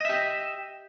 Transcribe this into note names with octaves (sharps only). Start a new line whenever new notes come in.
G4 D#5 E5